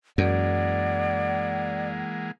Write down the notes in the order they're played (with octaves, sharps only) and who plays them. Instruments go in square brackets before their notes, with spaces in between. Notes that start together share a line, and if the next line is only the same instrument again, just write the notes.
[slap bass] F#2 [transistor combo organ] E3 G#3 A#3 [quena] D5 [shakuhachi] F#5